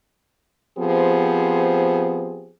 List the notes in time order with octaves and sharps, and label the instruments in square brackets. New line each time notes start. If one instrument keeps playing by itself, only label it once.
[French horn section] F3 B3 C4 G4 G#4 C5